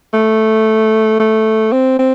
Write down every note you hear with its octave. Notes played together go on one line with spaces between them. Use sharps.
A3
A3
C4
C4